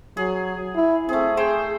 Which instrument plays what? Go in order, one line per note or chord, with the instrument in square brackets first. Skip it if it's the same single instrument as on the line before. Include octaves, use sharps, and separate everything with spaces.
[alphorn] F#3 [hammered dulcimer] G#4
[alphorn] E4
[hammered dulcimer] A3 G#4 [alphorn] C4
[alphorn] G#4 [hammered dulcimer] C5 G5